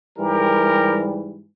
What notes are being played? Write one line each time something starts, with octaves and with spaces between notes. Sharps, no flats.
G#2 E3 G3 G4 A#4